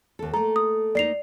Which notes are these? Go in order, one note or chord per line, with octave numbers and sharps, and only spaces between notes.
D#2 A4
A3 A#3 A4 A#5
D#6
A#3 D#4 D5 C7 F7